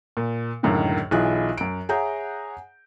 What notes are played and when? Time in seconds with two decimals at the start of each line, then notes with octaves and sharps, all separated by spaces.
0.17 A#2
0.63 C#2 F#2 A2 D3 D#3
1.11 B1 E3 E4 F4 G#4 F#6
1.57 F#2 D7
1.89 G#4 C#5 E5 F#5 A#5 G6